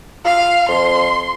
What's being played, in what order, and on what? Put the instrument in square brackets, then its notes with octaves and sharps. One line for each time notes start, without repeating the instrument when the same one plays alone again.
[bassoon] F4 [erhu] F5
[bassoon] F2 [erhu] C6